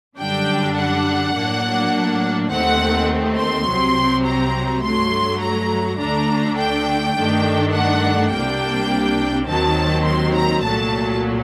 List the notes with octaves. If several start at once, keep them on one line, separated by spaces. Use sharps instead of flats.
F#2 D3 G3 D4 G5
F#5
A2 F#3 A#3 D4
D#2 D#3 A3 C4 F#5
C6
C2 C3 F#3 C4
A#5
G2 F#3 A3 C6
A#5
D2 D3 A3 D4 A#5
G5
G2 D#3 A3 D4
F#5
C2 C3 G3 A#3 D4 G5
D#2 D#3 F#3 C4 A5
C6
A#5
C2 A#2 F#3 A3 A5